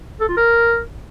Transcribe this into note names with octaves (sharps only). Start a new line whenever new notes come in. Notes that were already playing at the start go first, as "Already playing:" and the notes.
A4
F4
A#4